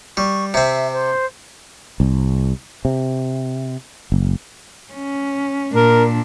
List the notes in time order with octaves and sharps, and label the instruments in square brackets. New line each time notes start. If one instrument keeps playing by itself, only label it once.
[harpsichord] G3 [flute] C#6
[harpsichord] C3 C4 [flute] E5
[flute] C5
[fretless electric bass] C2
C3
F#1
[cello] C#4
[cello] A#2 D4 [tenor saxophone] A#4